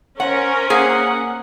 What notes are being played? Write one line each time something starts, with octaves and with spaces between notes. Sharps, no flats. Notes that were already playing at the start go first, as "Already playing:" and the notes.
C#4 A#4 C5 F#5
A#3 G#4 F#5